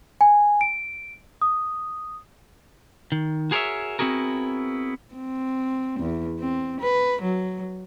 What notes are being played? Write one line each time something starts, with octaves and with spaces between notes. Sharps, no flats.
G#5
D7
D#6
D#3
F#4 G#4 A#4 C5 C#5 E5
B3 C4 E4 F#4 G#4 A#4
C4
E2
C4
B4
F#3